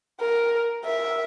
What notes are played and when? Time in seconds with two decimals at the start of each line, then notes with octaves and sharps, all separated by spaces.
0.20 A#4
0.85 A#4 E5